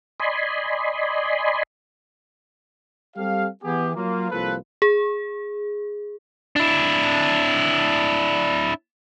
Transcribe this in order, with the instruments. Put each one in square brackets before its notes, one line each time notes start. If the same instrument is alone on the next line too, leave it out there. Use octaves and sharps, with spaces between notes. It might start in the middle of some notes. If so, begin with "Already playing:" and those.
[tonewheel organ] D5 D#5 G#5 B5 C6
[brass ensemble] G3 C4 G4 A4 F5
E3 B3 G4 G#4
F#3 A#3 F4
C2 F3 A#3 F4 A4 B4
[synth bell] G#4
[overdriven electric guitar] D4 E4